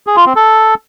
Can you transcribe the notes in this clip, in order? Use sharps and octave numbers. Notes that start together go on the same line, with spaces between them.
G#4
F4
C4
A4